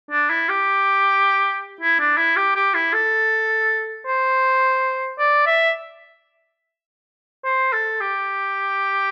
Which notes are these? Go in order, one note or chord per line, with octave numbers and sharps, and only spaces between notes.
D4
E4
G4
E4
D4
E4
G4
G4
E4
A4
C5
D5
E5
C5
A4
G4